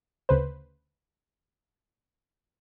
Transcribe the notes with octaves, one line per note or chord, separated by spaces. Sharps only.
D2 C#3 B4 C5